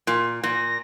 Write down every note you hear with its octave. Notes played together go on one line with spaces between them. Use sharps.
A#2
A#2 A#6